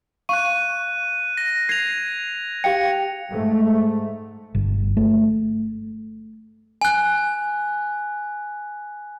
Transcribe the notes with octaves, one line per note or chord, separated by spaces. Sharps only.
F5 C#6 F#6 D#7
A#6
G#6 C7 F7
G4 F5 G5 C#7
G#2 A3
G1
A3
G#5 F#6